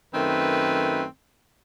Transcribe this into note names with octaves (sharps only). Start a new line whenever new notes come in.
F#2 D#3 A3 C4 B4